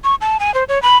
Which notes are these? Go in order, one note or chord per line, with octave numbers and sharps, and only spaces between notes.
C#6
A5
G#5
C5
C#5
B5